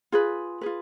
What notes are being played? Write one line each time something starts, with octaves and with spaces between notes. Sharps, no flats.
F4 G#4 B4
F4 G#4 B4